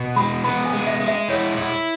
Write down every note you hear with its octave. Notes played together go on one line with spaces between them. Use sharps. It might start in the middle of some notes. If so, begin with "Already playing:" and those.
Already playing: B2 B3
G#3 B5
B3 B5
G#5
G#3
E5
G#3
E5
E4 C#5
E4